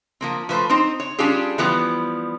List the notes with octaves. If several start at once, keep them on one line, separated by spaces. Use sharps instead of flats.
F3 A#3 C4
F3 A3 B4 C5
C4 D#4 C5
C#5
G3 C#4 D4 F4 G4 G#4
E3 F3 G3 B3